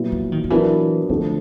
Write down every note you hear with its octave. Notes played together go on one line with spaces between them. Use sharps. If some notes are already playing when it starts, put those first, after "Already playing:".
Already playing: A#2 F#3 B3 E4
F3
D#3
D#3
E3 F#3 B3 D4 F4 A#4
D3 D#3 F3 A3 C4